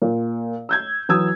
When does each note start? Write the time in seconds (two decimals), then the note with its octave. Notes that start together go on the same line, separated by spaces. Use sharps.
0.02 A#2
0.69 E6 G6 G#6
1.09 E3 F#3 D#6 E6 G#6